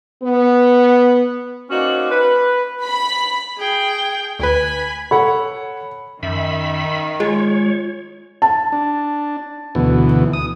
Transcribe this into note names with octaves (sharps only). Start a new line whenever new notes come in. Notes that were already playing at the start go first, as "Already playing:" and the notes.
B3
A#3 C#4 D#4 F#4 C5 D5
B4
B5
G#4 G5
D2 B4 G#5 B5
A4 C#5 F#5 B5
F#2 D#3 E5 B5
G#3 F4 C#5
A5
D4
D2 B2 E3
D#6